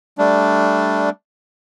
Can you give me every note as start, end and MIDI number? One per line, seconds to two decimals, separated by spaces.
0.18 1.10 55
0.18 1.10 57
0.18 1.10 62